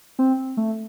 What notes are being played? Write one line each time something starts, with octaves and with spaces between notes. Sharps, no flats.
C4
A3